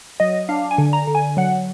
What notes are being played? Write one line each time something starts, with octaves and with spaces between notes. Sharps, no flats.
F#3 D#5
D4 F5
G#5
D3
A#5
D3
G#5
F#3 F#5